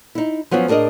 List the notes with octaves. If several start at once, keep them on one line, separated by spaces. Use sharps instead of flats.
D#4 E4
F3 F#3 B3 C#4 F4
A2 D4 G#4 A#4 D#5